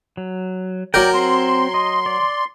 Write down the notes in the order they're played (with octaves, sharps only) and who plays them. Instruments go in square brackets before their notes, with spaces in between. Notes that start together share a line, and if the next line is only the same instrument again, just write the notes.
[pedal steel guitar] F#3
[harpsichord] F#3 A#4 [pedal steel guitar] D5 G5
[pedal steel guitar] C4 [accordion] C6
[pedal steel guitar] D#5
D5